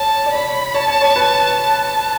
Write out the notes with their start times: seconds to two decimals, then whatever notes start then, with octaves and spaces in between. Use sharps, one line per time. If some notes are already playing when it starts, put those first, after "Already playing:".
Already playing: C#5 A5
0.26 D5
0.33 C#5 B5
0.74 C#5 A5
0.88 C#5
1.01 C#5
1.16 B4
1.57 A5